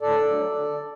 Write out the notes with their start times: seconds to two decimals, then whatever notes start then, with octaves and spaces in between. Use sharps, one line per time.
0.01 A2 A4 D5
0.28 F#3 A3 D4
0.55 D3